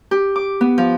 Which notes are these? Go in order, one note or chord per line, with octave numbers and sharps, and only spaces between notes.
G4
D6
B3
F3